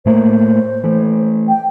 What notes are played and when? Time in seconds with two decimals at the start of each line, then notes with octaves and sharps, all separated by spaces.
0.06 A2 A3 A#3 C5
0.84 E3 A3
1.48 G5